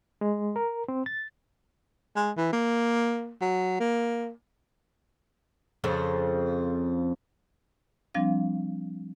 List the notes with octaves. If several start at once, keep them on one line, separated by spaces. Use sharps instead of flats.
G#3
A#4
C4
A6
G#3
E3
A#3
F#3
A#3
F2 C#3 F3
F3 G3 C4 D4 F5